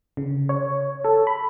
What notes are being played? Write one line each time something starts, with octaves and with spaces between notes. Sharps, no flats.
C#3
C#5
A4
B5